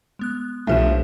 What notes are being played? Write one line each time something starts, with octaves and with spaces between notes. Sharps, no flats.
G#3 B3 F#6
B1 F3 A3 D4 G4 E7